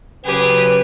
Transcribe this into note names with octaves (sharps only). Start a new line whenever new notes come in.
C#3 F#3 G4 G#4 B4